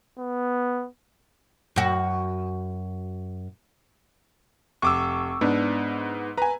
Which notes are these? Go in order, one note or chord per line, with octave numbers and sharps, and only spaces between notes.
B3
F#2 F#4
F1 C#6 D6 E6
G#2 B3 D4
B4 G#5 A#5